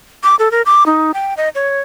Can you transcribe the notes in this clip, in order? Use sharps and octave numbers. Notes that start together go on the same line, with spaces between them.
D6
A4
A#4
D6
D#4
G5
D#5
C#5